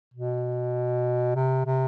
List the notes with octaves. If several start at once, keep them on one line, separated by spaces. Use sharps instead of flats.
B2
C3
C3